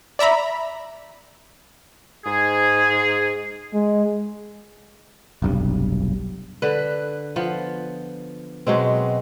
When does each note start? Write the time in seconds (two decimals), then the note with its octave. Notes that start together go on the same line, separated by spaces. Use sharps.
0.19 D5 E5 A#5 B5
2.25 G#2 G#4
3.74 G#3
5.42 F1 B1 G2
6.62 D3 B4
7.36 F3 B3
8.67 B2 F#3 G#3 C4